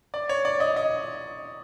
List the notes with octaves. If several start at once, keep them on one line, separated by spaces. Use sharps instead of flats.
D5
C#5
D5
D#5
D#5